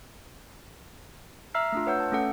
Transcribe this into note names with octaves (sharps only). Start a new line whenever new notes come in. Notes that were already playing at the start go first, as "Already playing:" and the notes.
E5 A#5 E6 F6 C7
A3 D4 F4
B4 C#5 F#5 E6 G6
A5
A3 C#4 A4 F#5